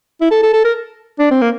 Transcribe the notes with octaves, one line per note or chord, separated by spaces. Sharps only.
E4
A4
A4
A4
A#4
D4
C4
A#3